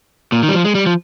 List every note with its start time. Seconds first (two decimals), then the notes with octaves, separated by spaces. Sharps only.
0.32 A#2
0.43 D#3
0.49 G3
0.54 F3
0.64 G#3
0.75 G3
0.86 F3